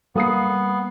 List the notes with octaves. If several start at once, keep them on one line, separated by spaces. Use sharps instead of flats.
G3 A#3 B3 D#6 C7